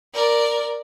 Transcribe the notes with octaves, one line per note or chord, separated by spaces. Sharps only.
A#4 D5